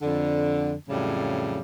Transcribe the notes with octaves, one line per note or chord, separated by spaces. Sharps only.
F2 D3
F2 A2 C#3 F#3 G3